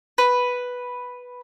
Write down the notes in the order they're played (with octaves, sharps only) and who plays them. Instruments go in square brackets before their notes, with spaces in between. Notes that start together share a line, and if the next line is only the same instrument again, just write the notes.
[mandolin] B4